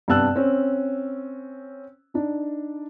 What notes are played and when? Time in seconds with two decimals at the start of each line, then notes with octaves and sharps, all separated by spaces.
0.08 G2 C3 B3 A5 E6 F#6
0.35 C4 C#4
2.14 D4 D#4